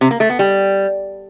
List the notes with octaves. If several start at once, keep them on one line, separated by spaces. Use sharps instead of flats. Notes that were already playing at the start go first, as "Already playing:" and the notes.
C3
A#3
A3
B3
G3